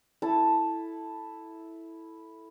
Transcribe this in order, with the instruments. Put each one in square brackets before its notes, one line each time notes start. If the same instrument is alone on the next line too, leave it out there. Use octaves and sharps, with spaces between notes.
[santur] E4 A4 A5